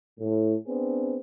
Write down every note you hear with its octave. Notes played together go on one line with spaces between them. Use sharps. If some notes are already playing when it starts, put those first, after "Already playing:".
A2
B3 C4 D4 G#4